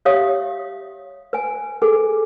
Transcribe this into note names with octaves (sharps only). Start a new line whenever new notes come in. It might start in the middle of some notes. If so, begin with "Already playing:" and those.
G4 C#5 E5 F5 D#6
B4 G#5
G#4 A4 B4 G#5